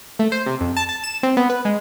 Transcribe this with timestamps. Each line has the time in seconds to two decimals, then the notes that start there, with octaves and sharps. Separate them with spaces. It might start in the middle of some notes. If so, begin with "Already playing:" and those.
0.19 A3
0.32 C5
0.46 C3
0.61 F2
0.77 A5
0.89 A5
1.04 E7
1.23 C4
1.37 B3
1.50 B4
1.65 G#3